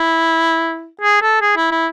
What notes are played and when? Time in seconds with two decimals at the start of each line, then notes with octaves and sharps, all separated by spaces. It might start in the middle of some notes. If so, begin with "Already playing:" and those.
Already playing: E4
1.02 G#4
1.22 A4
1.42 G#4
1.57 E4
1.71 E4